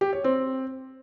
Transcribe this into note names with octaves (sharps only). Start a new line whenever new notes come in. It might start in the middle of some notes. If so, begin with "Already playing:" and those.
G4
C#5
C4